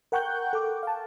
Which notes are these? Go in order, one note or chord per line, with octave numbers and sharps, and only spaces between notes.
A#4 F#5 G5 C#6 F#6 G6
A4 D6
F5 A5